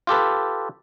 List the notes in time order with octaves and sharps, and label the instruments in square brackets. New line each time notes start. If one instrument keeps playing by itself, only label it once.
[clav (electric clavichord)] F4 G4 A4 B4